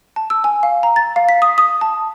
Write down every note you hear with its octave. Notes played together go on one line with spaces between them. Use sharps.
A5
E6
G#5
F5
A#5
A6
F5
B6
D#6
D#6
A5